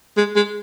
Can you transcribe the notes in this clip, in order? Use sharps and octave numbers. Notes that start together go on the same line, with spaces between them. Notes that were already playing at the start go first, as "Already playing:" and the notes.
G#3
G#3